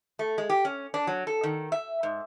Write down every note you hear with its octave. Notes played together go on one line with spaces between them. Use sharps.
A3
G#3
G4
C#4
D4
F#3
A4
D#3
E5
G#2